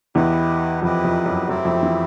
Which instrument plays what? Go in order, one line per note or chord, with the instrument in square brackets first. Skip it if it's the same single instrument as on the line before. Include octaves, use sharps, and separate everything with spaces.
[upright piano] E2 E3 [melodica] E4 G4 B4 D#5
[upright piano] F2 F3 [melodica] E4 G4 B4 D#5
[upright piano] F2 F3
F#2 F#3
[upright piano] F#2 F#3 [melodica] A3 C4 E4 G4
[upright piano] F2 F3
E3